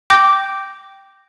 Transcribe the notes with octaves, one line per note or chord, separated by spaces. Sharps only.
G5 D6 G6 A#6